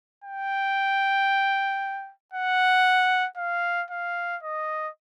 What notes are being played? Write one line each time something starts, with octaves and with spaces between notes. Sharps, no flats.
G5
F#5
F5
F5
D#5